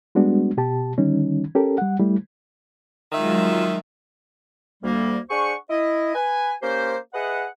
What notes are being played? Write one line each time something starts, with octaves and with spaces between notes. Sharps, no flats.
G3 G#3 B3 D4 F#4
B2 G4 A5
D3 D#3 G3 C#4 D#4
C#4 G4 A4 A#4
G3 F#5
G3 A3 E4
D#3 F#3 G#3 F4 E5
D2 G3 A#3
D4 G#4 C5 F#5 C#6
E4 D#5
B4 G#5
A#3 C#4 G4 C5
G#4 B4 D#5 E5 F#5